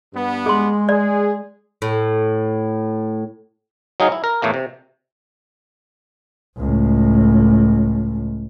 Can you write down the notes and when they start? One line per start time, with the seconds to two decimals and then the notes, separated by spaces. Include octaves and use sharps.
0.14 G2 B3
0.46 G#3 G#4 C6
0.89 G#4 D5
1.82 A2
4.00 F#3 D#4 G#4 F5
4.12 E4
4.24 A#4
4.42 E2 A2 A3 A#3
4.54 C3
6.58 C#2 A2